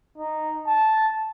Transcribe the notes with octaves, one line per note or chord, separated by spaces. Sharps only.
D#4
A5